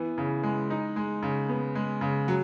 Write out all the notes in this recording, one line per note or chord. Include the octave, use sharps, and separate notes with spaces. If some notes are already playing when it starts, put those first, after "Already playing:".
Already playing: E3 B3
C#3
G#3
D#4
G#3
C#3
B3
G#3
C#3
F#3